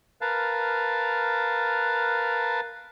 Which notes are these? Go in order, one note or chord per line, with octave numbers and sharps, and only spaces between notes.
A#4 B4 F5 A5